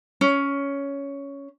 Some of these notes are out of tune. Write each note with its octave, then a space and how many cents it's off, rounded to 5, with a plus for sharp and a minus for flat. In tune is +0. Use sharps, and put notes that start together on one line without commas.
C#4 +10